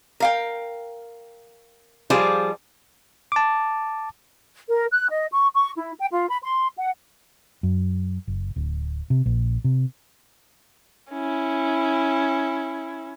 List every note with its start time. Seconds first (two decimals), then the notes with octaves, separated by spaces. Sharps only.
0.20 A#4 F5 G5
2.10 F3 G3 F4 G#4 C5 D5
3.32 A5 D6
4.68 A#4
4.91 F#6
5.09 D#5
5.31 C#6
5.54 C#6
5.76 E4
5.99 G5
6.10 F4
6.29 B5
6.42 C6
6.76 F#5
7.63 F#2
8.28 F#1
8.56 D1
9.10 C3
9.26 A#1
9.64 C3
11.12 C#4 E4